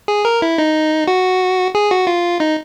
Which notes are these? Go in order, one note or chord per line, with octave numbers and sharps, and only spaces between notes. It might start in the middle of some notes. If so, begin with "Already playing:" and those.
G#4
A#4
E4
D#4
F#4
G#4
F#4
F4
D#4